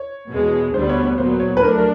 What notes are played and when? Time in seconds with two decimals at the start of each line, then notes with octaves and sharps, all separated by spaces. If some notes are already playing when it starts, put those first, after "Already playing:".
Already playing: C#5
0.31 E2 B2 G#3
0.74 D2 D3 G3 B3 C5
0.89 C#5
1.03 C#5
1.18 A#2 F#3 B3 C5
1.40 C#5
1.57 B4
1.62 F#3 A3 D4 A#4
1.78 A#4